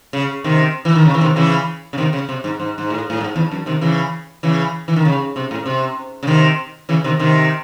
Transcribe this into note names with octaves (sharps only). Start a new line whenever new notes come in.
C#3
C3 D#3
E3
D#3
C#3
E3
C3 D#3
C#3 E3
C#3
C3 D#3
C#3
C3
G#2
G#2
G#2
A2
A2
G#2
E2
F#2
C3 D#3
C#3 E3
C#3 E3
E3
D#3
C#3
C3
A2
C3
C#3
C3 D#3
C#3 E3
C3 D#3
C3 D#3